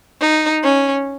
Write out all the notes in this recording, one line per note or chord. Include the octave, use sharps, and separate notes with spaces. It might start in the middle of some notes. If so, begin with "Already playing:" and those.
D#4
C#4